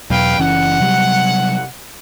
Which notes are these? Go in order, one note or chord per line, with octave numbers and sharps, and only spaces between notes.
E2 B2 F#3 B4 F5 G5
F#1 E3 C#4 F#5
C3 F#3 G3